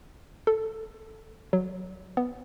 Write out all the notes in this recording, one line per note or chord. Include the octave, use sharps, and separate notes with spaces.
A4
F#3
B3